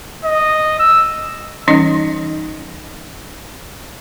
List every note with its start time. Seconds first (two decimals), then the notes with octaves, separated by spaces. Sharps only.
0.25 D#5
0.79 E6
1.68 E3 G3 C#4 D#4 D#5